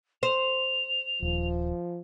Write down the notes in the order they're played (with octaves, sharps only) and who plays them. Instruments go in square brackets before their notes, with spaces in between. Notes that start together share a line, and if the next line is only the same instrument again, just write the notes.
[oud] C5 [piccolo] F7
[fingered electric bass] D#1 [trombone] F3